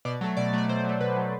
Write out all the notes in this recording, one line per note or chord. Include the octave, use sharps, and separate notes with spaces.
B2 D5
F#3 A3
B2 D5
F#3 A3 D5
B2 C5
F#3 A3
B2 B4
F#3 A3